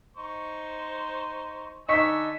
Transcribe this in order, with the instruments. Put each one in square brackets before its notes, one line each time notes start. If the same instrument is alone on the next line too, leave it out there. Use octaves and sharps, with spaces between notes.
[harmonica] D#4 C5 C#6
[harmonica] D3 G#5 E6 [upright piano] D#4 C#6 B6